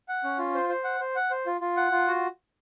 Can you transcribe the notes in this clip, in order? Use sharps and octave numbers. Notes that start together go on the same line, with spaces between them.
F#5
C#4
F4
C5
C5
F#5
C5
F#5
C5
F4
F4
F#5
F4
F#4